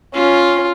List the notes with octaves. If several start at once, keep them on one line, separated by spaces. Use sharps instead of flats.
C#4 F4